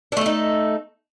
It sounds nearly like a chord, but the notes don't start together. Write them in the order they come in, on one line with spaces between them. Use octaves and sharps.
D4 A3 A4 D#4